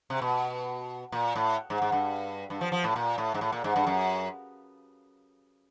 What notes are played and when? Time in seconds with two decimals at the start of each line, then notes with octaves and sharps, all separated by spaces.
0.10 C3
0.21 B2
1.12 A#2
1.36 A2
1.70 G#2
1.82 G#2
1.92 G2
2.50 G2
2.61 F3
2.72 F3
2.84 A2
2.96 A#2
3.18 A2
3.34 G#2
3.41 A2
3.52 A#2
3.64 G#2
3.76 G2
3.87 F#2